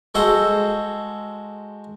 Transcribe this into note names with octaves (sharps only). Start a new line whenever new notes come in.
G#3 F#4 A4 C5 A#5